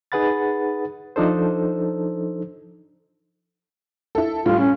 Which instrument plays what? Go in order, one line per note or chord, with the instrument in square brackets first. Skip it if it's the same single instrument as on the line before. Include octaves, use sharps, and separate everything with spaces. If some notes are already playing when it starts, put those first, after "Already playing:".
[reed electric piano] D#4 G#4 B4 F#5 B5 A6
F3 D4 D#4 A4 C5
[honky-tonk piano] E4 A4
[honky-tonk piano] A2 G3 [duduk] F4
[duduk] C#4